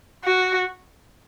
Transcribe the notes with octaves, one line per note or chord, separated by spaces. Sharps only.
F#4